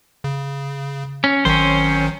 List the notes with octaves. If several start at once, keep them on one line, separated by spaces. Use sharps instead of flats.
C#3
C#4
G#1 D#3 F#3 C#4 C5